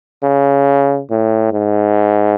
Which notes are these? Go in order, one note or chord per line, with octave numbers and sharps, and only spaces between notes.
C#3
A2
G#2